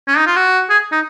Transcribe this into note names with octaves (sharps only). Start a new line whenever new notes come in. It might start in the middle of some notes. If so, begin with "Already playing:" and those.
C#4
D#4
F4
F#4
G#4
D#4